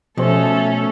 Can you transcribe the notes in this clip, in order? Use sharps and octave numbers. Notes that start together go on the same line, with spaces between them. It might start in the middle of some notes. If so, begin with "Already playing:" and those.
B2 F3 A3 C#4 G4 A4 C5